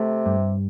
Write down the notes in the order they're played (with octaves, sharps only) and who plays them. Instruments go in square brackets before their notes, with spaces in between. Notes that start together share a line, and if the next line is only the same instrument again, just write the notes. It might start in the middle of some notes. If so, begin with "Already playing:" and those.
Already playing: [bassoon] C3 [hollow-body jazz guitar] A3
[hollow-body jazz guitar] G2